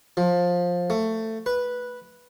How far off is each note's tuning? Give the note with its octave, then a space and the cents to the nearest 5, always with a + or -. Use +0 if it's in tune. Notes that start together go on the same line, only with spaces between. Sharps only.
F3 +15
A3 +15
B4 -10